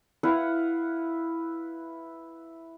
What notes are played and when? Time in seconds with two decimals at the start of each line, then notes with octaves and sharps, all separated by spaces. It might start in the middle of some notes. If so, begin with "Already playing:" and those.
0.23 E4 B4 F5 F#5